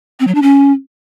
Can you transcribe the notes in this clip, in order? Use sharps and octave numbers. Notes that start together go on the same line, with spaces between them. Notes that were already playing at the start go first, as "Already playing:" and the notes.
C4
F#3
D4
C#4